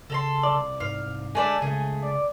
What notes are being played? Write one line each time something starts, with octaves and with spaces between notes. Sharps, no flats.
C#3 A4 A#5 C6
C2 D5
G#2 F5
D3 G#3 A3 D5 E5 G#5
C#2 C#3 A3 G#4
D5